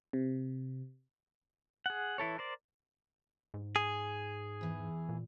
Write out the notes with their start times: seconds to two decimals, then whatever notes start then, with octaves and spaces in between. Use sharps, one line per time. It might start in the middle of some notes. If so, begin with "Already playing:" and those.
0.13 C3
1.86 G#4 F#5
2.18 E3 E4 A4 C#5
2.38 A#4 C5 D5
3.54 G#2
3.76 G#4
4.61 E2 E3
5.09 A#2